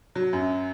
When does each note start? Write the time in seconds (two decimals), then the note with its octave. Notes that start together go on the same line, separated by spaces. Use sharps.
0.15 F#3
0.33 F#2